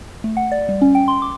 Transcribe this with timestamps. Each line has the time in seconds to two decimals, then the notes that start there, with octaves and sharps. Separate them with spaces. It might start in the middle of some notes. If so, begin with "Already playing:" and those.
0.24 A3
0.37 F#5
0.52 D5
0.69 G3
0.81 C#4
0.95 G5
1.08 C6
1.22 D6